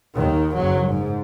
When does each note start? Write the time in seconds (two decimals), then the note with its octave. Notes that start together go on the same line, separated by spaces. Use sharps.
0.15 D#2 D#3
0.55 F#1 F#3
0.88 G#2